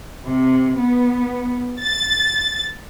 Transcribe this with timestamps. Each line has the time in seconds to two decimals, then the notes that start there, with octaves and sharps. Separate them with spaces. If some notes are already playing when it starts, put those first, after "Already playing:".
0.26 C3
0.79 B3
1.82 A6